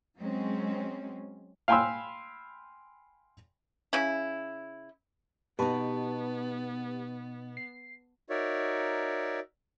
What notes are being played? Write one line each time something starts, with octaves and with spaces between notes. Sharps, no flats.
F#3 G#3 C4 C#4
F5 G5 G#5 B5 C6 E6
C#3 E4
B2 B3 D#4 G4 B4 A5 C#6
C7
D#4 F#4 A#4 C#5 D5 E5